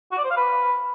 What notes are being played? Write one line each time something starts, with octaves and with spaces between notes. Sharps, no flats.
F#4
D5
C5
F5
B4